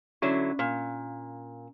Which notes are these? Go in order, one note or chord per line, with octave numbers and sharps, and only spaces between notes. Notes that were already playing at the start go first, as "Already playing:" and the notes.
D3 F#3 C#4 E4
A#2 F5